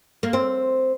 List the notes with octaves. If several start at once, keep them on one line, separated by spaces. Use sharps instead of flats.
A#3
C4